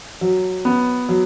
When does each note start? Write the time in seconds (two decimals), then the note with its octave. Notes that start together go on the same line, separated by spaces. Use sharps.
0.21 F#3
0.65 B3
1.09 F#3